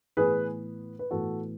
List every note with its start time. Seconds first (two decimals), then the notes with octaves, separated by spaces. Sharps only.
0.17 A2 E3 B3 G#4 B4
0.99 B4
1.11 A2 E3 B3 F#4 A4